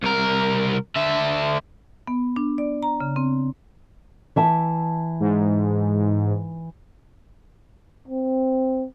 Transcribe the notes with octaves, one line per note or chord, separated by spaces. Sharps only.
C2 A#4
D3 E5
B3
D4
D5
A#5
C#3
C4
E3 E5 A5
G#2
C4